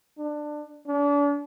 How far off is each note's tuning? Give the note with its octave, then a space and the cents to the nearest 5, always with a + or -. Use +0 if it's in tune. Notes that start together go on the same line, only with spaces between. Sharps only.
D4 +20
D4 -40